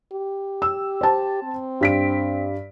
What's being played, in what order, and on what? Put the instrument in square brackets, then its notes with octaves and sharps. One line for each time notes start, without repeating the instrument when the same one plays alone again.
[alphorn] G4
[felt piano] E6
C5 A5
[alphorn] C4
[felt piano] G2 B6 D7